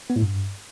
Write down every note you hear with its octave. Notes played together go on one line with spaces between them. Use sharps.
B3
A2
G2